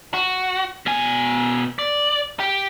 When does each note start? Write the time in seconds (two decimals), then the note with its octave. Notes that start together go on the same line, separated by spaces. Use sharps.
0.14 F#4
0.86 B2 G#5
1.79 D5
2.40 G4